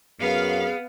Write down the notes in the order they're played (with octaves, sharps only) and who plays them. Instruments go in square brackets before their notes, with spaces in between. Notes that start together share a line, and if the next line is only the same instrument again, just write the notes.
[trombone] F#2 [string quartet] B3 [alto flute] G#4 [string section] F5